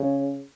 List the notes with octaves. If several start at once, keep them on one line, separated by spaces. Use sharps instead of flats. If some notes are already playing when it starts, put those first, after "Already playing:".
Already playing: C#3